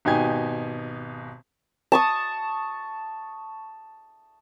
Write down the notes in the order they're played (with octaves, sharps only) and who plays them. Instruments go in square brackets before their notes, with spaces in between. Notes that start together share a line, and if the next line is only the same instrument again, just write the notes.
[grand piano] G#1 B2 D#4 G4 G#5 G#6
[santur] A5 C#6 D#6